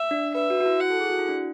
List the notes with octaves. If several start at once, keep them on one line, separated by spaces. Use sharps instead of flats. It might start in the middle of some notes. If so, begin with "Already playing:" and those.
Already playing: E5
D4
B4 E5
F#4
F#4
E4
F#5
A4
G#4
F#4
E4
D4